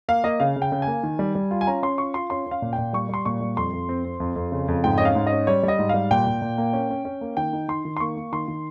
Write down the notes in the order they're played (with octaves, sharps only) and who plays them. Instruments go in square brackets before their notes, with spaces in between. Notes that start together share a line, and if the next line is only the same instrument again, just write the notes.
[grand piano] A#3 F5
A#3 D#5
C#3 F5
C#3
G5
C#3
G#5
A#3
D#3
G3
G3
F4
G#5
C#4 A#5
C#4 C6
F4 C#6
F4 C6
C#4 C6
C#4
F5
A#2
G5
A#2
G3 C#6
G3 C6
A#2 C#6
G3
F2 C6
F2
C4
C4
F2
F2
C#3
F2
G#2 G5
C#4 D#5
F5
G#2
D#5
C#4
G3 C#5
G3 D#5
G#2
G3 F5
A#2 G5
A#2
A#2
A#3
C#4
C#4
C#4
A#3
D#3 G5
D#4
D#3 C6
D#3
C6
A#3 C#6
A#3
D#3 C6
D#3